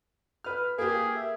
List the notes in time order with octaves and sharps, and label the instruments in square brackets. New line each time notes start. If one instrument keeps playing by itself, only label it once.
[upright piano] B4 F6
[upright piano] A#3 G4 [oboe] G#4
[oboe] E5